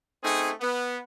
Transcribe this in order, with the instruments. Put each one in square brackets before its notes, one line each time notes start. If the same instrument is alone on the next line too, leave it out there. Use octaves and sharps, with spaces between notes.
[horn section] A3 C4 C#4 D#4 G#4
B3